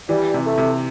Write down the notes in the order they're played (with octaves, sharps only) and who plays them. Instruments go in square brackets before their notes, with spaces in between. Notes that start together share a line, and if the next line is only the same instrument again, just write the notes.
[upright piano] E3 [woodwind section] G3
[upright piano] C3
[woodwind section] A3
[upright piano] C3